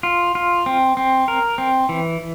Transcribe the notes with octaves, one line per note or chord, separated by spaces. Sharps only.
F4
F4
C4
C4
A#4
C4
E3